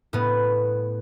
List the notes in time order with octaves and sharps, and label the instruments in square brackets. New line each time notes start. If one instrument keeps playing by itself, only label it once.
[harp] A2 B3